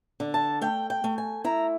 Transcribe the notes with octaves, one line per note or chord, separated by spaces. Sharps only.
D3
A5
A3 G5
G5
A3
G#5
E4 A#5